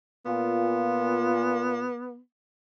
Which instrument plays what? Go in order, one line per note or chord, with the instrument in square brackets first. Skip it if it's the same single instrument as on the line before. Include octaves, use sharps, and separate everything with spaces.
[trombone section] A#2 F4 [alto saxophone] B3